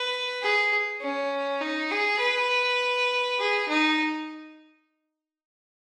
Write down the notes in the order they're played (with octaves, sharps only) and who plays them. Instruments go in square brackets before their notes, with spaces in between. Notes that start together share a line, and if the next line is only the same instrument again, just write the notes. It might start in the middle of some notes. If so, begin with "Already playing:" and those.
Already playing: [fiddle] B4
G#4
C#4
D#4
G#4
B4
G#4
D#4